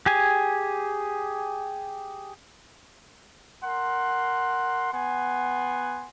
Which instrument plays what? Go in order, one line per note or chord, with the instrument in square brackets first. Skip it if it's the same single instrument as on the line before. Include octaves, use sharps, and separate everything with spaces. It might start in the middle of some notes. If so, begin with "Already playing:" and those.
[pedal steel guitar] G4 G#4 G#5
[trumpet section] A#4 F#5 C6
B3 F#5 G#5 C6